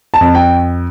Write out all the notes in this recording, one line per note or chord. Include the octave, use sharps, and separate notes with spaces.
A5
F2
G5